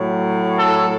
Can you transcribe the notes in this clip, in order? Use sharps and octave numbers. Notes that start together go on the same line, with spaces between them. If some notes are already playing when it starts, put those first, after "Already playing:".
Already playing: A2 F#3
A4